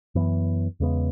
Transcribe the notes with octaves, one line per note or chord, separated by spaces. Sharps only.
F#2 E3 B3
E2 C#3 G#3 B3